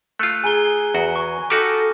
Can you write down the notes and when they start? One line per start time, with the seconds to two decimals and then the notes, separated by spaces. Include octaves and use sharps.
0.19 A3 F4 F#6 C#7 D#7
0.44 G#4 G#5 A#5 G7
0.94 E2 F#4
1.16 G#5 C#6
1.50 D#4 F#4 G4 A4 D6 F6 A#6